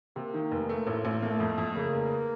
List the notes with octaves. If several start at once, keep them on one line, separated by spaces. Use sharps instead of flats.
C3 A#3
D#3
F1
A3
A1
A1
A3 A#3
F2
F2
C#3 A#3
F1